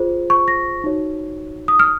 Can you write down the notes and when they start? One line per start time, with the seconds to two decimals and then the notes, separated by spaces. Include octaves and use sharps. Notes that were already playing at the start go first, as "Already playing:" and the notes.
Already playing: F4 G#4 C5
0.30 C#6
0.48 A#6
0.84 D#4 F#4 C#5
1.68 D#6
1.80 F6